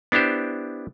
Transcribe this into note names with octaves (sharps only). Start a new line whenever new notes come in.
B3 D4 E4 G4 C5